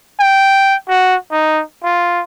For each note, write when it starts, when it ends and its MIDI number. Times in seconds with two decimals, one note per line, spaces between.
0.19 0.76 79
0.88 1.16 66
1.32 1.63 63
1.84 2.23 65